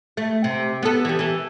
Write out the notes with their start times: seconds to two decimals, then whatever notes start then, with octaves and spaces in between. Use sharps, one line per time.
0.17 A3
0.44 C3
0.83 B3 A4
1.05 E3 G3
1.19 E3 A4